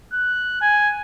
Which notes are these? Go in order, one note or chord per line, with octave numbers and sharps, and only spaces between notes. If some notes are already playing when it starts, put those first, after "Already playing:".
F#6
G#5